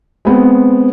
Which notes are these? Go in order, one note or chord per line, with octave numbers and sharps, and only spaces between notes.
G#3 B3 C4